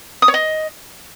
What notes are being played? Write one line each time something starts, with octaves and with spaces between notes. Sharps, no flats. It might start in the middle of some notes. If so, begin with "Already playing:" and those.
D#6
C#5
D#5